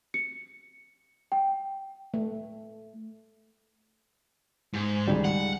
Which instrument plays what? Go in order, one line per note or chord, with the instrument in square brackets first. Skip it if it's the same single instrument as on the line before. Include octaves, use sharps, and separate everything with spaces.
[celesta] C#7
G5
[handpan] A3
[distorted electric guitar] G#2
[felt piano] C#2 D#3 G3
[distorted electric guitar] F#5